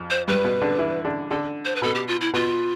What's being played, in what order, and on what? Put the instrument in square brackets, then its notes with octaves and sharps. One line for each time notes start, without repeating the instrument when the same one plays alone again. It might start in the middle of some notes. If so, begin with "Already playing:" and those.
Already playing: [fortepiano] F2 F3
[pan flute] C5
[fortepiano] G2 G3 [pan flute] B4
[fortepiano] B2 B3
D3 D4
E3 E4
D3 D4
[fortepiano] D3 D4 [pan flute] A4
[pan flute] C5
B4
[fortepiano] B2 B3 [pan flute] A4
[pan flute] G4
F4
E4
[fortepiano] B2 B3 [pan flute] F4